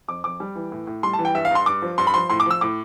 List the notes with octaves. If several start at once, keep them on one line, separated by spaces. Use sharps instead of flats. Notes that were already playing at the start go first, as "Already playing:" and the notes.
F2 D6
F2 D6
G3
E3
A2
A2
G3 C6
A5
E3
G5
G2 E5
F5
G2 C6
G2 D6
F3
G2 C6
B5
F3 C6
A2 C6
D6
F3 E6
A2 D6